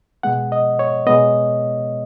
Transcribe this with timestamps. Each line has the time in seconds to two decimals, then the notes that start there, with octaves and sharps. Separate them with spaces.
0.23 B2 G#3 B3 F#5
0.52 D#5
0.79 C#5
1.07 B2 G#3 B3 D#5